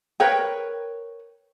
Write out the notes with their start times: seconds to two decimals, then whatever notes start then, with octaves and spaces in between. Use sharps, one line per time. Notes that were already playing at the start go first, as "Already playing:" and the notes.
0.20 A#4 B4 C#5 G5